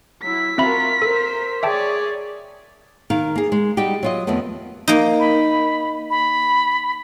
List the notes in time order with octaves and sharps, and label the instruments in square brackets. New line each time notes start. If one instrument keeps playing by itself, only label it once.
[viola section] F#3 E4 [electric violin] B6
[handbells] C4 E5 B5 [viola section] F4 F#4 A#4
[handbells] A4 [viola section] A#4 C5
[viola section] G#4 C#5 D5 [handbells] E5 G5 A5
[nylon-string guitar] D#3 A#4 F5
A#3 G#4
G#3
G3 D#4 F#4 G4
F#3 F4 D#5
F2 D#3 A3 B3
[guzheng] A#3 D#4
[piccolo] B5
B5